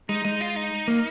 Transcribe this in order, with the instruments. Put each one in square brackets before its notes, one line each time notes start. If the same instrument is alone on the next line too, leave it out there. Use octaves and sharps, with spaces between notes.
[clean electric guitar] G#3 [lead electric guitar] D#4
[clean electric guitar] G#3 [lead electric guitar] D#4
[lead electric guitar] F4
D#4
[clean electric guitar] A#3